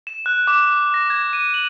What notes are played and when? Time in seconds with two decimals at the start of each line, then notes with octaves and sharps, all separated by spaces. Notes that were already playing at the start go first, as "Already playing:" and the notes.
0.07 E7
0.26 F#6
0.47 D6
0.94 A#6
1.10 G#6
1.33 D#7
1.54 F#7